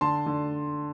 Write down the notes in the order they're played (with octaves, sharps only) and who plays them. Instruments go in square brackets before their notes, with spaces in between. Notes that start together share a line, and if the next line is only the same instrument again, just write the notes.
[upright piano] D3 A5 C6
D3